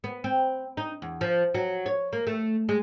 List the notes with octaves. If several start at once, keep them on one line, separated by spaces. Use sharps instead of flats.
B3
C4
D#4
E2
F3
F#3
C#5
A#3
A3
G#3